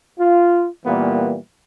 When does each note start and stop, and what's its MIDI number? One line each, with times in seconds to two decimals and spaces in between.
0.19 0.67 65
0.85 1.37 46
0.85 1.37 52
0.85 1.37 55
0.85 1.37 58
0.85 1.37 59